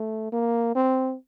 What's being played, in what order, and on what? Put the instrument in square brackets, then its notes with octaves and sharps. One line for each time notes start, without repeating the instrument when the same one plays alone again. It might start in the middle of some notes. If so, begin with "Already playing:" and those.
Already playing: [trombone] A3
A#3
C4